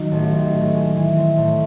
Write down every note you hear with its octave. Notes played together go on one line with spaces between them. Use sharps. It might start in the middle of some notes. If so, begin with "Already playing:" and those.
Already playing: D#3 F#3
A1
D#3
A2
G#3
E3
C4
A2